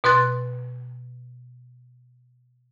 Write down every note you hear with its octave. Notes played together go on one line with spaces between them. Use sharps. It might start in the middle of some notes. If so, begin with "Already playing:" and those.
B2 B4 C6 F#6 A6